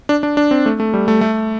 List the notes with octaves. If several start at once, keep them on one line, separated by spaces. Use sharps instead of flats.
D4
D4
D4
C4
A3
A3
G3
A3
A3